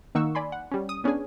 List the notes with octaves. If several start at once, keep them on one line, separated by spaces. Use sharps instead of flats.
D#3 A#3 D#4 F#5 C#6 E6
D5 G#5 B5 C6
F#5
G3 C#4
D#6
B3 C#4 D4 G#4 G#5